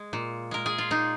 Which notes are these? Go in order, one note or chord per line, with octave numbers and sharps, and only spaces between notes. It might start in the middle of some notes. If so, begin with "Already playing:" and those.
Already playing: G#3
A#2
G#3 A#4
G#4
F4
A#2 D#4